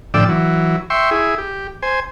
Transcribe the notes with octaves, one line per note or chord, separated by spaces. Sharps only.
A2 D3 F3 D5 G5 E6
E3 F#3
E5 G5 C6 C#6
E4 G#4
G4
C5 G#5